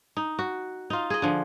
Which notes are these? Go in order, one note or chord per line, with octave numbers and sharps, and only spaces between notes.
D#4
F#4
D#4 F4
G#4 D#5
D3 F3